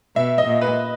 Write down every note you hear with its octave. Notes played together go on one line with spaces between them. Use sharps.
B2 E5
D#5
A#2
B4